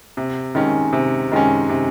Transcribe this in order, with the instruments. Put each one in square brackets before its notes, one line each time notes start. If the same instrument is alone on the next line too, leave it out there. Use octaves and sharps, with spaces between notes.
[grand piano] C3
D#3 G#3 C#4
C3
D#3 G#3 C#4
C3